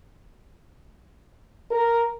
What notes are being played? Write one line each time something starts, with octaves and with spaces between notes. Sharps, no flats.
A#4